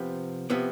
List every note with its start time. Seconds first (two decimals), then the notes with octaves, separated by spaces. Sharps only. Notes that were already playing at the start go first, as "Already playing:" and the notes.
Already playing: C3 F3 B3
0.50 C3 F3 B3